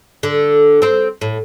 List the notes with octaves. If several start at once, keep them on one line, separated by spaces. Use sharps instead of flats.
D3
C4 C5
A2